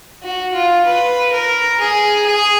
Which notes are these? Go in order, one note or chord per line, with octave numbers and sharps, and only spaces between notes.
F#4
F4
B4
A#4
G#4
G#4